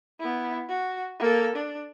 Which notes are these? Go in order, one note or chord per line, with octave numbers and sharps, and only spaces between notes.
B3 E4
F#4
A#3 A4
D4